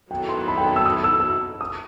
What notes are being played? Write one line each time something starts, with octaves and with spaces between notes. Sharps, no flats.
D#3 F#3 B3 E4 A4 G5
C6
B5
G5
A5
E6
D#6
E6
E6
D#6